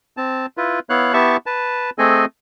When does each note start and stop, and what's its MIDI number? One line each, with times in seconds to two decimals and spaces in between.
0.17 0.46 60
0.17 0.46 81
0.57 0.79 64
0.57 0.79 65
0.57 0.79 71
0.90 1.13 59
0.90 1.13 64
0.90 1.13 73
0.90 1.13 77
0.90 1.13 90
1.13 1.37 59
1.13 1.37 64
1.13 1.37 67
1.13 1.37 76
1.13 1.37 81
1.13 1.37 85
1.46 1.90 71
1.46 1.90 81
1.98 2.25 57
1.98 2.25 60
1.98 2.25 68
1.98 2.25 69
1.98 2.25 75
1.98 2.25 80